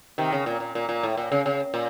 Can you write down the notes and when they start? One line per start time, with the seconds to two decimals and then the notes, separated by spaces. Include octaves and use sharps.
0.18 C3 D#3
0.32 C#3
0.46 A#2
0.60 A#2
0.75 A#2
0.89 A#2
1.03 A2
1.17 A#2
1.32 C#3
1.46 C#3
1.74 A#2